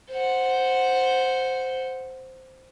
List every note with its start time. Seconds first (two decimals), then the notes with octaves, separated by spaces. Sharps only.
0.10 C5 F#5